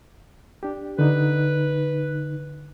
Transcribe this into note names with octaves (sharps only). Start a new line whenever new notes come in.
D4 G4
D3 D#4 B4